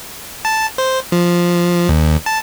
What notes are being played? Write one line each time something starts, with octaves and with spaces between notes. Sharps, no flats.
A5
C5
F3
D#2
A5